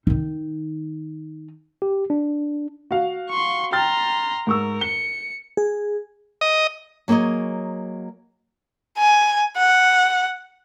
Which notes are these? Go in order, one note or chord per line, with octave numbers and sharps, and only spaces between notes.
D#3 D#4
G4
D4
F#4 F5
C6 C#6
G5 A#5 C6 F6 A6
G#2 A#4 C#6 E6
C#7 G7
G#4
D#5
F#3 A#3 G#4 C#5 D#5
G#5
F#5